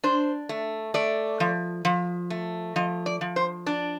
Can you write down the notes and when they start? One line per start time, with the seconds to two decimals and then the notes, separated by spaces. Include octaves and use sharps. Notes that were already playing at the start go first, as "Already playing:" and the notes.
0.04 D4 C5
0.49 A3
0.94 A3 D5
1.40 F3
1.85 F3
2.30 A3
2.76 F3 D#5
3.06 D5
3.21 F3
3.36 C5
3.66 D4 D5